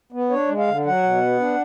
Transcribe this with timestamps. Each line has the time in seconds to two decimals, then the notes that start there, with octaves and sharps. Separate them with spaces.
0.12 B3
0.30 D4 C#5
0.48 G#3
0.58 F5
0.67 D3
0.85 F#3 F#5
1.03 B2
1.21 B3
1.40 D4